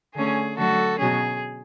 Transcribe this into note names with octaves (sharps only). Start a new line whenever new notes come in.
D3 A3 C#4 G#4
D3 F#3 A3 F#4 A4
B2 F#3 C#4 G#4